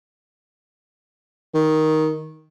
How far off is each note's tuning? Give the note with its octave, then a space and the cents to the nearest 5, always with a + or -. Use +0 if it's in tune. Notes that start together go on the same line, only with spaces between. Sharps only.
D#3 +5